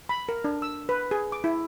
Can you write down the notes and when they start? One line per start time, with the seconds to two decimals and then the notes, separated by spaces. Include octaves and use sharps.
0.09 B5
0.29 A#4
0.44 D4
0.62 E6
0.89 B4
1.11 G#4
1.32 D6
1.44 E4